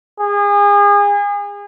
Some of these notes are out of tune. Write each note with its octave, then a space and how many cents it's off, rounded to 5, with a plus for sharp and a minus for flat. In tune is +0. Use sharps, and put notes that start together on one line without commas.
G#4 -35